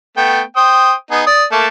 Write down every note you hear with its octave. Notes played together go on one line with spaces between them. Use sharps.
A3 B3 G5
C5 G5 D#6
B3 D#4 G#4
D5 D#6
A3 A#3 A5